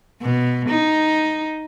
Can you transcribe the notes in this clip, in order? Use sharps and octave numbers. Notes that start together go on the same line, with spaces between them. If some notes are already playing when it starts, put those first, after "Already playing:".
B2
D#4